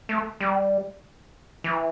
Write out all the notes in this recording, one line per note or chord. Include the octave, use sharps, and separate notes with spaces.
A3
G3
E3